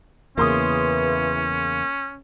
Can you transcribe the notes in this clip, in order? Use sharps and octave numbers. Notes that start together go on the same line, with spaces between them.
E2 C#3 E3 A#3 C#4 C6 D#6